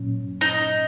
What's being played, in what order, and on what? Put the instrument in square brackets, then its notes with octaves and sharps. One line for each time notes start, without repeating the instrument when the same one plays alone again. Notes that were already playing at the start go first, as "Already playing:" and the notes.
Already playing: [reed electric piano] A#2 F#3 C#4
[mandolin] D#4